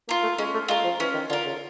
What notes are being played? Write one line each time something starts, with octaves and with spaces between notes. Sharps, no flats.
A#3 F4 A#4
A3
G#3 C#4
A3
G#3 F4 A#4
F3
E3 C#4
D#3
D3 F4 A#4
C#3